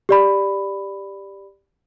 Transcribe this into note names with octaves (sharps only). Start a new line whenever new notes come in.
G4 D5 B5